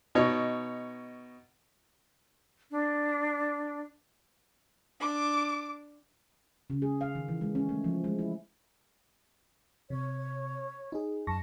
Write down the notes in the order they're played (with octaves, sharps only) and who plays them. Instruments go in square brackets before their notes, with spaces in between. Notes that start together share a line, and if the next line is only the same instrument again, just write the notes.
[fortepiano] B2 D#4 C#5
[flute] D4
[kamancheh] D4 D6
[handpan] C#3
G#4
F5
D#3
E3
G#3
C#4
A3
F3
G#3
E4
[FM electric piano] C3 [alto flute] C#5
[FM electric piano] D#4 G#4
[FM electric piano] F#2 C#6 A#6 [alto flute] A5